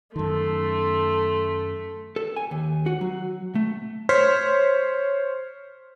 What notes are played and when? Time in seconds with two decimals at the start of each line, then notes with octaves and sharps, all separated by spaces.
0.16 F#2 D#3 A3 A4 A5 C6
2.16 A4
2.36 G#5
2.51 D#2
2.86 F#4
3.01 F#3
3.55 A3
4.09 C5 C#5 C6 F6 B6